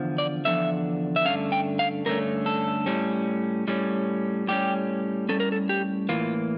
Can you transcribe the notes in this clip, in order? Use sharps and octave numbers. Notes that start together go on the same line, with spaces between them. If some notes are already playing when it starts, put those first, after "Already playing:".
Already playing: E2 D3 F3
D5
E2 D3 F3 E5
E5
G2 D3 A3 C#4 F5
G5
F5
G2 D3 A3 C#4 A#4
A4
A2 G3 C#4
A2 G3 C#4
A2 G3 C#4 G4
A2 G3 C#4 A4
A#4
A4
G4
A2 E3 A#3 F4